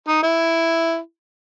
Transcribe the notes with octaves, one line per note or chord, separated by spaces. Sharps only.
D#4
E4